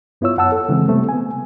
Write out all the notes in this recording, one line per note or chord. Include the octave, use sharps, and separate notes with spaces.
G2 B3 E4 F4 C#5 E6
F#2 F#5 A5 E6
A4
C#3 E3 G#3 C4
C3 G3 A3 B3 C4
B3 G#5